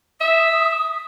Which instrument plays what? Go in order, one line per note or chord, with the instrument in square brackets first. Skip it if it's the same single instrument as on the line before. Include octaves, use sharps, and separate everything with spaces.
[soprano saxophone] E5 [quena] D#6